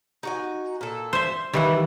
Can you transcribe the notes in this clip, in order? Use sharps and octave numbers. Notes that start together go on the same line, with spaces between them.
D#4 F#4 G#5
A#2 A4
C5 E5
D#3 E3 G3 E4 F5 F#5